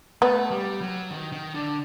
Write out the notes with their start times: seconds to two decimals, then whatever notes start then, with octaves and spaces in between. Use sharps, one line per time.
0.22 A3 B3
0.51 G3
0.81 F#3
1.11 D#3
1.32 D#3
1.55 D3